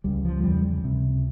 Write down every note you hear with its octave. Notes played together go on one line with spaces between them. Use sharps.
C#2 C#3 G3
F3
E2 C#3 G3
C#2 C3